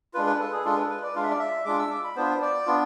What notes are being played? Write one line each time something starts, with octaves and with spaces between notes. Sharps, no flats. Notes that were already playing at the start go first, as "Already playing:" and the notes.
G#3 D4 F4 B4
B4
A4
G#4
G#3 D4 F4 A4
B4
B4
D5
G#3 D4 F4 F5
E5
D5
E5
G#3 D4 F4 D6
E6
D6
B5
B3 D4 F4 C5
D5
B3 D4 F4